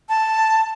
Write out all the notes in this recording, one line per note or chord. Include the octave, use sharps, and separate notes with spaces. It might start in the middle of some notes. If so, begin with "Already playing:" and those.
A5